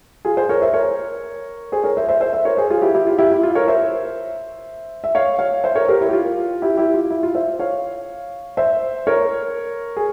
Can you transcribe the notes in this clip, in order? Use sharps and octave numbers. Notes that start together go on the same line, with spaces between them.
F4 G#4
G#4 C5
A#4 C#5
C5 E5
A#4 C#5
G#4 C5
A#4 C#5
C5 E5
C5 E5
C5 E5
C5 E5
A#4 C#5
G#4 C5
F4 G#4
E4 G4
E4 G4
F4
E4 G4
E4
F4
A#4 C#5
C5 E5
E5
C#5 F5
C#5 F5
C5 E5
A#4 C#5
G4 A#4
E4
G4
F4
E4 G4
E4 G4
F4
E4
F4
C5 E5
C#5 F5
C5 E5
A#4 C#5
G#4